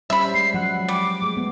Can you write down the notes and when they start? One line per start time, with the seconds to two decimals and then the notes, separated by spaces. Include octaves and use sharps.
0.10 G3 C#4 C5 E5 B5
0.34 G#3 C7
0.54 F3 F#3 F#5
0.88 G3 D6
1.22 G#3 A3
1.37 B3